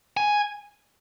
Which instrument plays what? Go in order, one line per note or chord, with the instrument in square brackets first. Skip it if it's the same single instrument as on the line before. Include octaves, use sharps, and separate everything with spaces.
[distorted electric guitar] G#5